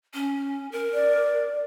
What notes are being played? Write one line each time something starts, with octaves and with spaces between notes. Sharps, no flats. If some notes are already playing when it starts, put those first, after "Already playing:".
C#4
A#4
D5